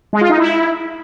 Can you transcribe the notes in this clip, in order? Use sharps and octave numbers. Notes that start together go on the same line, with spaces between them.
G#3
F4
D#4
E4